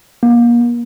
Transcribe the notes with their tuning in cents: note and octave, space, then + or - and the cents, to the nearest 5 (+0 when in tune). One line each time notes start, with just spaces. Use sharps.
A#3 +30